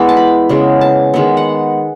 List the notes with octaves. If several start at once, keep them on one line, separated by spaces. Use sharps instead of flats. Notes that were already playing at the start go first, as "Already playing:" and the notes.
Already playing: E3 G#3 B3 E5
A5
B5
C#3 G#3 B3
A5
D#3 G#3 B3
F#5